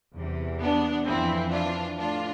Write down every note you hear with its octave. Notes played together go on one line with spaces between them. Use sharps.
E2 C3 E3
B3 D4
F2 E3 C4 E4
D4 F4
A2 E3 D4 F4